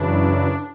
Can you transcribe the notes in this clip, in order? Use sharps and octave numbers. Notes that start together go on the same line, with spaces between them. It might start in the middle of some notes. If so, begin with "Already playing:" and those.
Already playing: F#2 C#3 E3 D4